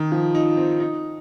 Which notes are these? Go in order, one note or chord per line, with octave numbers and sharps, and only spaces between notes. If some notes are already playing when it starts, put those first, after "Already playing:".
Already playing: D#3
F3
D#4
C4
D#4